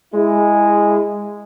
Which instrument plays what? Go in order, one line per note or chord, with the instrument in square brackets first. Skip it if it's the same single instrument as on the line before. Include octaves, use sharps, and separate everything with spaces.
[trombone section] G#3 E4